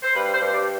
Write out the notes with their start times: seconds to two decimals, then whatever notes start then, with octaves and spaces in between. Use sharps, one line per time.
0.03 C5
0.16 G2 B4
0.34 C5
0.41 G2
0.54 D5